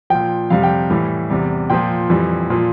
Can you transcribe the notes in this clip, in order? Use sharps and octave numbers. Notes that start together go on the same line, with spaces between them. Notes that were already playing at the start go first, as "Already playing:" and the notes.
A#2 F3 G5
F2 C3 G3 F5
G5
A2 E3 G3
E2 C3 G3
A#2 F3 G5
F2 E3 G3
A#2 F3